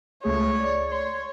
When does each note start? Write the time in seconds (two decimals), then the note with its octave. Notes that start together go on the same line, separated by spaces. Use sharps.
0.24 C#2 A3 G#4 C#5
0.59 D5
0.91 C#5 C6